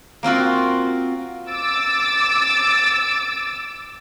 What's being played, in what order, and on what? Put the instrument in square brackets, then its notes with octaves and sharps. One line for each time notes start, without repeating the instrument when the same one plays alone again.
[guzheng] A#3 C4 F4 F#4
[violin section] D6 E6 A6